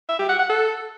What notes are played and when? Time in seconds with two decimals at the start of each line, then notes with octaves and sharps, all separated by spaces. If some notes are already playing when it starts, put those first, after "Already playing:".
0.09 E5
0.19 G4
0.29 F#5
0.39 F#5
0.50 A4